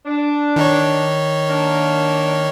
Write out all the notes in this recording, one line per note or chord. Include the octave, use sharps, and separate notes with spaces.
D4
D#3 D#4 C#5
A#3 D4